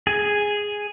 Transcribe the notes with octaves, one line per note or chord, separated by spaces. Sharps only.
G#4